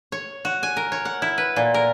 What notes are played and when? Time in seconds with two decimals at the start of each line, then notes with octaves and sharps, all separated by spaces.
0.12 C#5
0.45 F#4
0.63 G#5
0.77 A#4
0.92 C#5
1.05 F#5
1.22 E4
1.38 B4
1.56 A#2
1.74 A#4